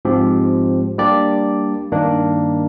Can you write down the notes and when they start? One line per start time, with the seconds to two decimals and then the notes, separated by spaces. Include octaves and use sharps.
0.05 G#2 F3 C4 G4
0.98 G3 A#3 D4 G4 D5
1.92 G2 D#3 A#3 D4